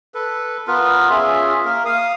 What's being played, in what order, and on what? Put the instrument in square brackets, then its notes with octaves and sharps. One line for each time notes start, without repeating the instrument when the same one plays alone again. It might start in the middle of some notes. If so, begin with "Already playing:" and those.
[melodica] A4 B4
B3 F4 A#4 B4
C#4 F4 G#4 E5
A#3 A#4
F5 D#6